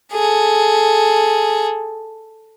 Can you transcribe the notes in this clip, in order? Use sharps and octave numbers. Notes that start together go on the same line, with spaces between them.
G#4 A4